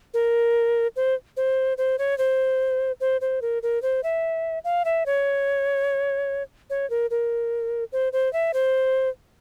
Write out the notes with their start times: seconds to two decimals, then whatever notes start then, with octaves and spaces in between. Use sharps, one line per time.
0.14 A#4
0.96 C5
1.37 C5
1.78 C5
1.99 C#5
2.18 C5
3.00 C5
3.21 C5
3.42 A#4
3.63 A#4
3.82 C5
4.03 E5
4.64 F5
4.85 E5
5.06 C#5
6.70 C#5
6.90 A#4
7.11 A#4
7.92 C5
8.13 C5
8.33 E5
8.54 C5